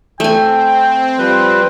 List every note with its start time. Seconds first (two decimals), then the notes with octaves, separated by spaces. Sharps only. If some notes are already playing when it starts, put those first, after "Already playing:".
0.20 A3 C4 G5 G#5
1.19 F3 G3 B4 C5